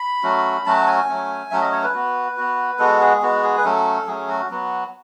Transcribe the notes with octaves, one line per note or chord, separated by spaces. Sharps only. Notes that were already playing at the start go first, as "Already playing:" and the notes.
Already playing: B5
F#3 A3 C#4 F#4
F#3 A3 C#4 F#4 A5
G#5
F#3 A3 C#4
F#3 A3 C#4 E5
D#5
C#5
B4
B3 F#4
B3 F#4
G#3 B3 F#4 A4
G#4
G#3 B3 F#4
G#4
B4
F#3 A3 C#4 A4
F#3 A3 C#4 G#4
F#4
F#3 B3 F#4